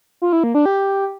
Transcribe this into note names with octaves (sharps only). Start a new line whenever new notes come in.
F4
E4
A#3
D4
G4